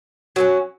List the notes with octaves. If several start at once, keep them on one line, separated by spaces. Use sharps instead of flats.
F#3 A#3 C#4